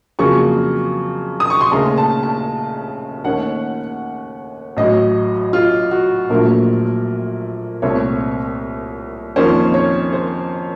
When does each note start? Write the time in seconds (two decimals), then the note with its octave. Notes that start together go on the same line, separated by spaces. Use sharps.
0.19 F2 C#3 F#3 A#3 C#6
1.40 D#6
1.50 C#6
1.61 C6
1.72 D#2 C#3 A3 A#5
1.98 A5
2.23 A5
3.24 D#2 D#3 A3 C#4 F#5
4.77 A1 A2 F#3 D#5
5.53 F4
5.91 F#4
6.29 A#1 A#2 F#3 A3 A#4
7.82 C2 A#2 A3 C4 C#5
9.36 F2 D#3 A#3 C#4 C5
9.74 C#5
10.12 C5